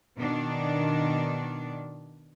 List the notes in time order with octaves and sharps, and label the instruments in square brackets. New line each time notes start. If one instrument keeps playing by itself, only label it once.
[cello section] B2 D#3 D4